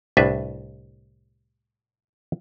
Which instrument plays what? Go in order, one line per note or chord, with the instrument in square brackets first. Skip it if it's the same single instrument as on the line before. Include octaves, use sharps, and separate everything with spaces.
[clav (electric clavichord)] C2 A2 D4 B4 E5